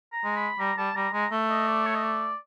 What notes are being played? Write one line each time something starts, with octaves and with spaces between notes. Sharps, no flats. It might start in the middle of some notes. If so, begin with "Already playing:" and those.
A#5
G#3
B5
G3 A#5
G3 A5
G3 A#5
G#3 A#5
A3
D#5
D5
C#5
D#5
D5